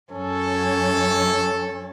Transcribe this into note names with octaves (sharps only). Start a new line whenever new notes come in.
F#2 C#4 A4